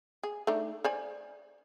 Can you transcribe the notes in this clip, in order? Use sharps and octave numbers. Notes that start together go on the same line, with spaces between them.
G#4
A3 D4 D#4
C5 D5 G#5